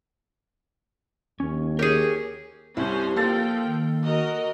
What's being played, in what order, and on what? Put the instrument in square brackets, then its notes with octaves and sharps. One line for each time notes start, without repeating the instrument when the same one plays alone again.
[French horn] D#2 [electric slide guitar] C#4
[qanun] G4 G#4 [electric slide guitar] A#4 C#5
[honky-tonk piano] C2 G2 [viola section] C#4 C5 [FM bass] E4 [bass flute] G4
[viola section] F3 G5 [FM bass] A#3 [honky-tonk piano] A4 F5 A6
[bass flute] D#3
[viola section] F#4 A#4 D#5